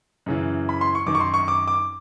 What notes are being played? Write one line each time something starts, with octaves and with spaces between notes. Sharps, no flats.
F#2 C#3 E3
B5
C6
C#6
F#2 D#3 D6
C#6
C6
C#6
D6
D6